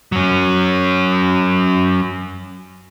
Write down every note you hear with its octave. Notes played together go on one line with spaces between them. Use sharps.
F#3 C#4